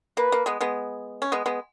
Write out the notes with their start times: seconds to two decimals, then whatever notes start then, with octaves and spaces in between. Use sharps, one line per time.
0.17 A#3 B4
0.32 A#3
0.46 G#3 B3
0.61 G#3 B3
1.22 C#4
1.32 G#3 B3
1.46 G#3 B3